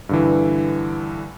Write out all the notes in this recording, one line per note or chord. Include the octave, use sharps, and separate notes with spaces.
G2 D3 E3